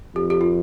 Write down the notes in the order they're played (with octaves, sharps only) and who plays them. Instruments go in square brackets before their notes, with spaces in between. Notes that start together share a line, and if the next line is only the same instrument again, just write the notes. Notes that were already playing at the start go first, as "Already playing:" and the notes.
[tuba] F2 [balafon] G4
[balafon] G4
F4